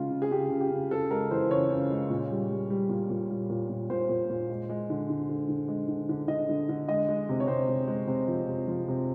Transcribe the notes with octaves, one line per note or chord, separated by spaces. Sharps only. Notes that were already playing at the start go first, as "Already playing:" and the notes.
Already playing: C#3 G#3 F4
C#3
G#4
C#3 G4
C#3
G4
C#3
C#3 A4
G#3 A#4
E3 C5
C#3 C#5
C#3
G#3
A#2
G3
G3
G3
A#2
A#2
G3
A#2
A#2
A#2 C5
A#2
A#2
G#3
G#3
D3
D3
D3
D3
G#3
D3
D3
D3 D#5
D3
D3
G#3 D#5
G#3
C3
C#5
C3 C5
C3
G#3
C3 C5
F3
C3
F3
C3